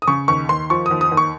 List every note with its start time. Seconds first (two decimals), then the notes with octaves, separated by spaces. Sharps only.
0.02 D#6
0.08 C#3 C#6
0.28 D#2 C#6
0.49 D#2 C6
0.70 F3 C#6
0.86 D#2 D#6
1.01 D#6
1.12 D#2
1.17 C#6